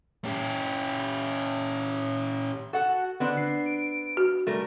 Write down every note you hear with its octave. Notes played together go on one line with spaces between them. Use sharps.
C#4 G4
F#4 A4 F#5
D3 B3 C4 D4
C7
D7
F#4
G3 A3 A#4